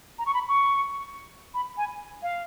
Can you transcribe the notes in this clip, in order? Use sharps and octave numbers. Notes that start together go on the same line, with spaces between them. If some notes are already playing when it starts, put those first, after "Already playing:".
A#5
C#6
B5
C#6
B5
G#5
F5